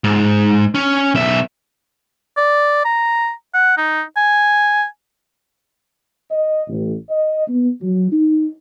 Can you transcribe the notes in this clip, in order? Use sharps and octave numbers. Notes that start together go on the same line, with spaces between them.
G#2
C#4
B1 E5
D5
A#5
F#5
D#4
G#5
D#5
A1
D#5
B3
F#3
D#4